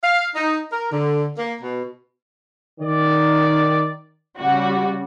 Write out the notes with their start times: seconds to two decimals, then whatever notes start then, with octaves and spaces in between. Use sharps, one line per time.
0.03 F5
0.35 D#4
0.72 A#4
0.91 D3
1.37 A#3
1.61 B2
2.80 D#3 D5
4.39 C#3 G3 F#4